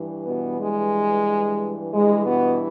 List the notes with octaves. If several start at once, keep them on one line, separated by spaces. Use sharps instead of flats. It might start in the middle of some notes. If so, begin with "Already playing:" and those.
Already playing: G2 E3
B2 B3
G#3
G2 E3 G#3
B2 B3